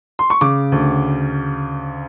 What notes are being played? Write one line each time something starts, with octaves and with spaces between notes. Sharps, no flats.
C6
C#6
C#3 D6
D2